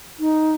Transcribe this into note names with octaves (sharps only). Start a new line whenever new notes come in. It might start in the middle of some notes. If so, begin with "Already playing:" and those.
D#4